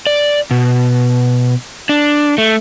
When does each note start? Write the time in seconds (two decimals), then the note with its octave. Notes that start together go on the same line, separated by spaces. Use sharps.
0.07 D5
0.51 B2
1.89 D4
2.38 A3